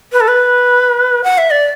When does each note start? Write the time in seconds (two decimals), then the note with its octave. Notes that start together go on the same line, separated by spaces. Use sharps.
0.13 B4
0.21 A4
0.28 B4
1.24 F#5
1.38 E5
1.51 D5